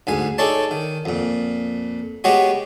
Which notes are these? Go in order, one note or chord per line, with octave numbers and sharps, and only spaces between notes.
D2 G#2 G#5
D#4 G#4 A4 C#5 D5 A5
D#3
F2 A#2
G#3 B3 F#4 G4 C#5 D#5